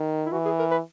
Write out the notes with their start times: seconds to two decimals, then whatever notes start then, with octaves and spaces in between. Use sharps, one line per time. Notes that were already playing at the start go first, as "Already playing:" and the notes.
Already playing: D#3
0.26 E4
0.32 E3 F#4
0.45 G#4
0.59 A#4
0.72 B4